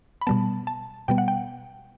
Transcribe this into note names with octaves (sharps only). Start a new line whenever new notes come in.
B5
B2 G3 B3 A5
A5
B2 G3 B3 G5
F#5
G5